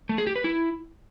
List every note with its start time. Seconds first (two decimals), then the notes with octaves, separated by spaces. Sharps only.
0.09 A3
0.18 G#4
0.27 G4
0.36 B4
0.44 E4